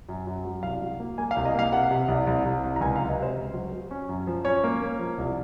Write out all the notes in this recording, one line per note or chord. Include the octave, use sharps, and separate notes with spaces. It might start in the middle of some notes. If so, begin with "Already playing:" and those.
F#2
F#2
F#3
C2 F5
F#3
A#3
A#3 G#5
F5
C2
D#5
A#3 F5
C3 F#5
C3
C2
C2
C2
C2
A#5
C#2 G#5
F5
F#3
D#5
C3 C5
C#2
F#3
F#3
C#4
F#2
F3
C#4 C#5
A#3
A#3
F3
C2